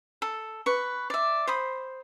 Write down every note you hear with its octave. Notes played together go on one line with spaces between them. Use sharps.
A4
B4 C#6
D5 E5
C5 B5 D#6